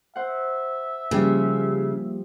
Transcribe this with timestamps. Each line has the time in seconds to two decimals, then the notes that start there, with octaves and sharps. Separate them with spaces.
0.16 C5 E5 F#5
1.11 C#3 F3 G3 A#3 F4 G4